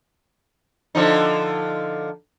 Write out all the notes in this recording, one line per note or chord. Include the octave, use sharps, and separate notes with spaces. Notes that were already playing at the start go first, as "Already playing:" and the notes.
D3 F3 D#4